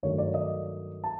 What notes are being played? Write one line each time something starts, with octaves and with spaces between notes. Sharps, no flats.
G2 D#3 F#3 A3 C#5
D5
D#5
A5